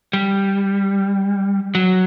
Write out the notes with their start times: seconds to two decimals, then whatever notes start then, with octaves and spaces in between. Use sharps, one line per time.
0.13 G3
1.75 F#3